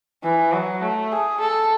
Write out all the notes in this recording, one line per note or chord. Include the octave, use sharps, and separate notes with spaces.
E3
F#3
A3
G#4
A4